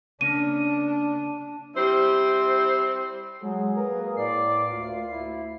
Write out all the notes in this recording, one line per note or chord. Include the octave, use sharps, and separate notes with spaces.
C#3 A#3 C#4 D4 D#7
G3 C4 E4 C5
F#3 G#3 G#4
A#3 A#4 B4
A2 D5 C7
D2 F4
D2 E4